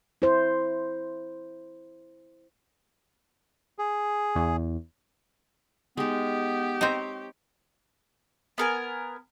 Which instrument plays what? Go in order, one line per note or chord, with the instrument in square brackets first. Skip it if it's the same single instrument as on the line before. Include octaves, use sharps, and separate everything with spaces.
[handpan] E4 C5
[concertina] G#4
[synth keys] E2
[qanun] G#3 D#4 [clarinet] B3 [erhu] G4
[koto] C4 D#4 [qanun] C5 C#5 A#5
[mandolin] B3 A#4 G#5